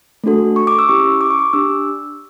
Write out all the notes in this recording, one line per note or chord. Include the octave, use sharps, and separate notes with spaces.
A3 D4 F#4 A4
C#6
D6
E6
C#4 E4 G4 C#6
D6
C#6
D6
D4 G4 E6